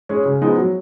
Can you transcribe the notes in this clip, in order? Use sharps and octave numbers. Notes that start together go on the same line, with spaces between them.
G#3 C#4 G#4
C#3
F3 G#3 B3 D#4
F#3